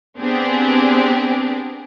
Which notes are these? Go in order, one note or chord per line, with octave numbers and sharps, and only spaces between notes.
B3 C4 D4 G4 G#4